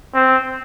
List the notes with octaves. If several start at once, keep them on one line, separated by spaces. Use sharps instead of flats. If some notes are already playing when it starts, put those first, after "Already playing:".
C4